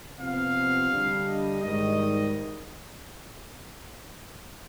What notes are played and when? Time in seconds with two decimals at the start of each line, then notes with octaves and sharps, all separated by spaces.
0.19 C3 F3 B3 F5
0.90 D3 G3 D4
1.26 D#5
1.62 G#2 D#3 G3 D#5